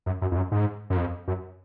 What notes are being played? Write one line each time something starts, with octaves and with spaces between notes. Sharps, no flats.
F#2
F#2
F2
F#2
G#2
F#2
F2
F#2